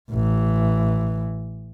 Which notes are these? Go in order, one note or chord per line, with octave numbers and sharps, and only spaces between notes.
A1 E3